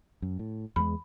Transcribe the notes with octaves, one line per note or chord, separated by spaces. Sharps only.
F#2
A2
E2 G3 G#3 B5